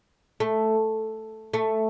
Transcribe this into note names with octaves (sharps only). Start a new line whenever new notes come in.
A3
A3